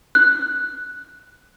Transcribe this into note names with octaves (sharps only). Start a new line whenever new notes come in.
F#6